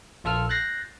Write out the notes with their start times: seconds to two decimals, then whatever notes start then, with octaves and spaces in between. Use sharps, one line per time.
0.24 A#1 F4 A4 E6 F6
0.49 F#6 G6 A6 A#6 C7